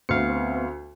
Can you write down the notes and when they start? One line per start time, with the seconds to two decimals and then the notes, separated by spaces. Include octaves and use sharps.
0.09 D2 B3 C4 F5 C#7